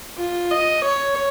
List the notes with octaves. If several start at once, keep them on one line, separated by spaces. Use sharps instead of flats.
F4
D#5
C#5